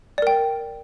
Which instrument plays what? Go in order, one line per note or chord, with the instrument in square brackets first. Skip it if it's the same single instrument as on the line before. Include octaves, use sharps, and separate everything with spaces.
[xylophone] D5
A#4
G5